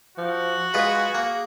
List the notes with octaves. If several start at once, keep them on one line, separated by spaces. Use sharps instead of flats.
F3 F#4
G#3 F4 G#4 B4
A#3